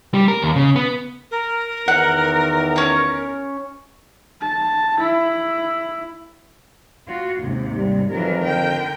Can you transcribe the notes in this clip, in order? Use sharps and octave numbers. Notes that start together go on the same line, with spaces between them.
G3
A#4
D#2
C#3
B3
A#4
E2 D#3 F#5
C#4 C#5
A5
E4
F4 F#4
D#2 G#2 C3
G3
F2 D#3 E3 F#3 A#4
D3 G5